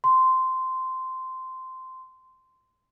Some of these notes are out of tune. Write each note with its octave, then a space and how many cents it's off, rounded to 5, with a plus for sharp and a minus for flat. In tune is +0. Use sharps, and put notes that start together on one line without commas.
C6 -10